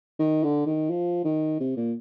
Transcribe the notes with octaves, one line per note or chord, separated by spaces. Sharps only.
D#3
D3
D#3
F3
D#3
C3
A#2